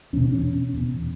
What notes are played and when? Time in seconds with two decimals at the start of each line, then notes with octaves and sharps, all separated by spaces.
0.13 E2 C#4
0.17 B2
0.23 D4
0.33 C#4
0.74 E2 B2